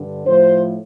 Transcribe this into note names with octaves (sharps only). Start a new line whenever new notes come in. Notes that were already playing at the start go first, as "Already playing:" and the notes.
Already playing: G2 D3
A2 F3 C5